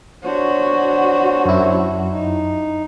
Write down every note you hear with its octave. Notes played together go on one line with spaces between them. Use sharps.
D4 F#4 C5 C#5
F#2 E4
D#4